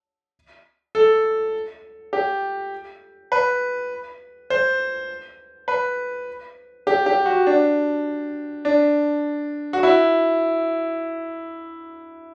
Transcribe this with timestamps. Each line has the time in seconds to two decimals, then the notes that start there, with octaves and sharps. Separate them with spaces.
0.95 A4
2.13 G4
3.32 B4
4.50 C5
5.68 B4
6.87 G4
7.06 G4
7.26 F#4
7.47 D4
8.65 D4
9.73 F#4
9.83 E4